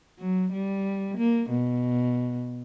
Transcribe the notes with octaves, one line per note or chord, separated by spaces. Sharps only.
F#3
G3
A#3
B2